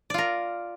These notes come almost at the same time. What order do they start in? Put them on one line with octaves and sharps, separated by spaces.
D5 F4 A#4